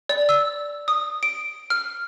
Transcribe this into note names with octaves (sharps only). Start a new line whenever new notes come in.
D5
E6
D#6
D7
F6